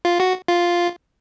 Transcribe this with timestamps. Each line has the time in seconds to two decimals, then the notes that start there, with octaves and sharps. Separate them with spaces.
0.05 F4
0.20 F#4
0.48 F4